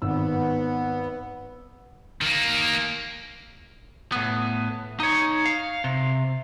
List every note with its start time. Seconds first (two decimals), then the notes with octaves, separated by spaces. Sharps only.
0.02 G#1 B3 E6
2.21 D#3 A#3
4.12 A2 B3
5.00 D#4 C#5
5.45 F5
5.84 C3